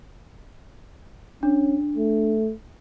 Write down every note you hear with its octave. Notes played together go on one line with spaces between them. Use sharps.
C#4 D4
A3